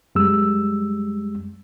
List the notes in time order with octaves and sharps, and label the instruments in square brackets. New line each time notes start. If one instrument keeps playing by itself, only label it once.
[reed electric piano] F#2 G3 G#3 E6